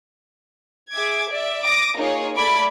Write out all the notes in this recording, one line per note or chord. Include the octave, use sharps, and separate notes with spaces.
G#4 E5 D6 G#6
D5 E5
D6 D#6 A#6
A#3 D#4 F4 G#4 C#5
A3 D5 B5 D6 G#6 D7